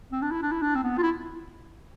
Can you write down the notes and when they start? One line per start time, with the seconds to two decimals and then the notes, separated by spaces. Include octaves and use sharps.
0.12 C4
0.22 D4
0.31 E4
0.42 D4
0.52 E4
0.62 D4
0.75 C4
0.83 B3
0.98 F4
1.03 E4